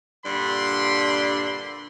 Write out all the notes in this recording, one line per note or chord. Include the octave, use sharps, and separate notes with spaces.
G2 A#2 D3 D4 B5 C6